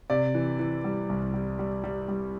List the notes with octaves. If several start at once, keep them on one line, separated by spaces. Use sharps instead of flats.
C3 D5
E3
E3
G3
C2
G3
G3
G3
G3